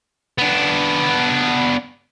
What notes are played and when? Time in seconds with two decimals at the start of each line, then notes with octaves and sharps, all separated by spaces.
0.38 B3 D4